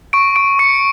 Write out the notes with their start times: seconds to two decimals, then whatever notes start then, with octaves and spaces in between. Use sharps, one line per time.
0.13 C#6 D7
0.36 C#6 D7
0.59 C#6 C#7